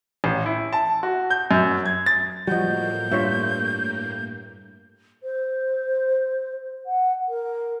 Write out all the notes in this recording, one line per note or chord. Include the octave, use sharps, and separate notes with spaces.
A1
E4
A5
F#4
G6
F#2
G#6
A6
A2 F3 G3 A#3 F#4 D#5 G6
G2 F4 C#5 E5
C5
F#5
A#4